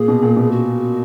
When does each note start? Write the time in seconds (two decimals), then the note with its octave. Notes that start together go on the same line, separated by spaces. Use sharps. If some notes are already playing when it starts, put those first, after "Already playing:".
Already playing: A#2 G#4
0.08 B2
0.22 A#2
0.37 B2
0.51 F#4